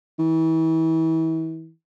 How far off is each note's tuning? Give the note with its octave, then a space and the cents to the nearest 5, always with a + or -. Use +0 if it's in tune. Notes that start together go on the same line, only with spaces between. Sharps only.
E3 -35